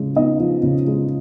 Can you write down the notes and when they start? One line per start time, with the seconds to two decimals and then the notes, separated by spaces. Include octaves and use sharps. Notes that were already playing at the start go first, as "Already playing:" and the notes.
Already playing: C#3 F3 G#3
0.16 B3 D#4 D#5
0.40 F3
0.63 C#3
0.87 G#3